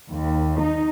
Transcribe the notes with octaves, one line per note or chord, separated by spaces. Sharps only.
D#2
D#4